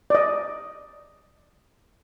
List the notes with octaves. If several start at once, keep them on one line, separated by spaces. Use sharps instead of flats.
D5 D#5